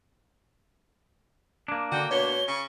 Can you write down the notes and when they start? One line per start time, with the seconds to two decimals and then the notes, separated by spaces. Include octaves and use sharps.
1.68 A#3 D4
1.92 D3 F#4 G5
2.11 B2 C#5 G7
2.47 C#3 C#6